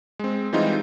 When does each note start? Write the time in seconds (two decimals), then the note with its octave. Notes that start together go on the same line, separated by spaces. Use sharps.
0.19 G#3 C4
0.53 E3 G3 G#3 C4 D#4 F4